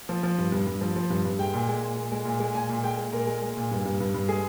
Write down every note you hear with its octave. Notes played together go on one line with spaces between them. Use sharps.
F3
F3
G2
G2
G2
F3
F3
G2
G2
G#3 G5
A#2
G#3
A#2
A#2
G#3
A#2
G#3
A#2 G#5
A#2
G#3 G5
G#3
A#2 A#4
G#3
G#3
A#2
G2
G2
G2
G2
G#3 G#4